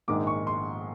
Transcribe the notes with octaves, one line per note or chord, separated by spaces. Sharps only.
A#1 G#2 D#3 G#3 D6
C#6
C6